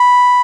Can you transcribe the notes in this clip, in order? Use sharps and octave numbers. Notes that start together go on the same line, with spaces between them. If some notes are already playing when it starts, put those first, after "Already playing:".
Already playing: B5